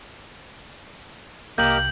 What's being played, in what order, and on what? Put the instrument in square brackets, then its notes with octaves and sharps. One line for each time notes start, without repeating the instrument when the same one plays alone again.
[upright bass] C2 [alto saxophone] A#3 [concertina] G4 A#4 D#5 [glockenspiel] G6 F#7